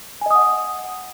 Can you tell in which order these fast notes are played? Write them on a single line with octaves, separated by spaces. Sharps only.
G#5 D#5 D#6 F#5